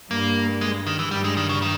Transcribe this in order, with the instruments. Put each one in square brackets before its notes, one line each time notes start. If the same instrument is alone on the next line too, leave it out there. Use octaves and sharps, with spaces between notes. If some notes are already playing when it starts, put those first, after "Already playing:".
[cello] G2 [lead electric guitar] A#3
[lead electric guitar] G#3
D#3
E3
[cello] G2 [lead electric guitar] G3
[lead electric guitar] G#3
D#3
C#3
D#3